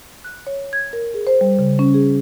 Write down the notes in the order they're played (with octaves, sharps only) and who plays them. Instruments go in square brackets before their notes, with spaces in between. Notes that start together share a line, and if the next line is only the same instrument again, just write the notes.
[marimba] F#6
C#5
G#6
A#4
G#4
C5
G3
C#3
C#4
G#4